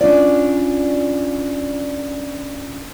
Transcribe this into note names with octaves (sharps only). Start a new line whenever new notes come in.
C#4 D4 F4 D5